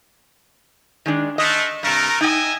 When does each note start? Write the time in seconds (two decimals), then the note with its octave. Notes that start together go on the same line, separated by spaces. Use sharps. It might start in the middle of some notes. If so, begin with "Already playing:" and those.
1.06 D#3 G#3 D4
1.38 G#3 A3 D#5
1.83 G2 C3 A3 A#4
2.21 D#4 D#5 E5 G5 G#5